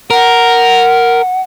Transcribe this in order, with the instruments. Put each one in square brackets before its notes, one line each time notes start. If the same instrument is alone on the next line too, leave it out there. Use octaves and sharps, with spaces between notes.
[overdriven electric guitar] A#4 [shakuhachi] F#5